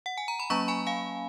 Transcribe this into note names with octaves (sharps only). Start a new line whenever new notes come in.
F#5
G#5
A#5
B5
F#3 A#3 C#4 A#5 C#6
G#5 B5
F5 G#5